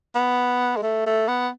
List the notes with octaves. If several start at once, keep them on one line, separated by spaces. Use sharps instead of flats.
B3
G#3
A3
A3
B3